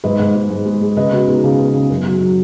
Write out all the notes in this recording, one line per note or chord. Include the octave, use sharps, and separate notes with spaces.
G#2 B4 D#5
G#2
G#3
G#2
G#3
G#3
C#3 B4 D#5
C#3 F#4 B4
B3 D#4 G#4
C#3
B3
C#3
F#2
F#3
F#3